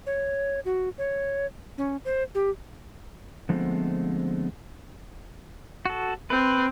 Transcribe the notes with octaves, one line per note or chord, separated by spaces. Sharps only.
C#5
F#4
C#5
C#4
C5
G4
D3 F3 G#3 A3 B3 C4
F#4 A4
C4 B4